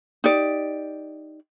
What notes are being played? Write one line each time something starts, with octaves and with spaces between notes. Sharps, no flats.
D#4 G4 D5